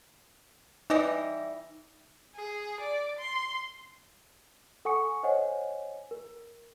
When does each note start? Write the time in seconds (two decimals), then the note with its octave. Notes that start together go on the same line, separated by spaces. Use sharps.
0.90 E3 G3 D#4 D#5
2.36 G#4
2.81 D5
3.19 C6
4.85 A4 F#5 G#5 C#6 D#6 C#7
5.23 C5 C#5 D#5 F#5 G#5
6.11 A#4